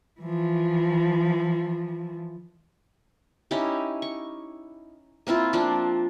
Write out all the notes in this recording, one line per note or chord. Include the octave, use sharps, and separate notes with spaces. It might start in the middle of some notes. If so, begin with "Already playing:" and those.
E3 F3
C#4 D#4 E4 G4
C#6
A#3 C4 E4 F4
F3 A#3 C4 D4